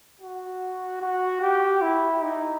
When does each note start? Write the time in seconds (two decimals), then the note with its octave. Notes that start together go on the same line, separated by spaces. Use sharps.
0.21 F#4
1.02 F#4
1.41 G4
1.82 E4
2.22 D#4